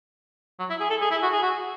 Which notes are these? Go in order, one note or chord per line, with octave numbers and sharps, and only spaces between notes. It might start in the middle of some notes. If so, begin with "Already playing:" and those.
F#3
E4
G#4
A4
G#4
E4
F#4
G#4
F#4